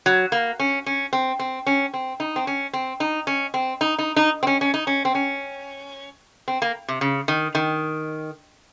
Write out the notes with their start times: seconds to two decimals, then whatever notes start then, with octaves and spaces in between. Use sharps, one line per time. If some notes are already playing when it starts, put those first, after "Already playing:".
0.06 F#3
0.32 A#3
0.60 C#4
0.86 C#4
1.13 C4
1.39 C4
1.66 C#4
1.94 C4
2.20 D#4
2.36 C4
2.47 C#4
2.73 C4
3.00 D#4
3.27 C#4
3.54 C4
3.81 D#4
3.99 D#4
4.16 D#4
4.43 C4
4.47 C#4
4.61 C#4
4.74 D#4
4.87 C#4
5.05 C4
5.15 C#4
6.48 C4
6.62 A#3
6.88 C3
7.01 C#3
7.28 D#3
7.55 D#3